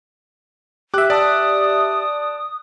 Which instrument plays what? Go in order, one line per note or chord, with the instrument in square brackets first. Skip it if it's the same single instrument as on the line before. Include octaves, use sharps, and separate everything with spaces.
[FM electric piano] G4 E5 [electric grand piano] D6 F#6
[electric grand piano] D5 A5 [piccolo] D#6